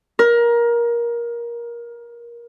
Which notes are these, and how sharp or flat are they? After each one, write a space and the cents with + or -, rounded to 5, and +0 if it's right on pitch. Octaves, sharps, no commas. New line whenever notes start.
A#4 +20